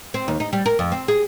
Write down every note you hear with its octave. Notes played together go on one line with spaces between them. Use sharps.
C4
D#2
D#4
G3
A#4
F2
C4
G#4